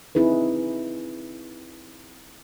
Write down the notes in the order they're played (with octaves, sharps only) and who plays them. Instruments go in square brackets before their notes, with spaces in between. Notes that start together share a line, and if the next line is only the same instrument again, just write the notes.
[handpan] C4 D#4 E4 G#4 B4